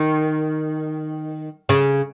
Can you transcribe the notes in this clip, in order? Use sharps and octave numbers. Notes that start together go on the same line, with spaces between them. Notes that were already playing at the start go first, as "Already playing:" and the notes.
Already playing: D#3
C#3